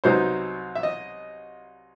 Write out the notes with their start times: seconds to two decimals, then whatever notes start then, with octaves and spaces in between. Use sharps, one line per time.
0.04 C2 C3 F#3 B3 D#4 C5
0.75 E5
0.83 D#5